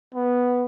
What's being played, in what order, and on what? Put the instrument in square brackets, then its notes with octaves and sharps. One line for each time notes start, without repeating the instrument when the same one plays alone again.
[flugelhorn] B3